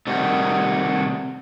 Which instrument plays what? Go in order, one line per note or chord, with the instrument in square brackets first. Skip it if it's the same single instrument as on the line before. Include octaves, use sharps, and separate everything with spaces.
[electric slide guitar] C3 D#3 G3 A3 F#4